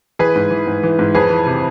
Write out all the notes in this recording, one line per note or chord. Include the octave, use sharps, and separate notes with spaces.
E3 G#4 B4
G#2
E3
G#2
E3
G#2
F2 G#4 B4
E3
C3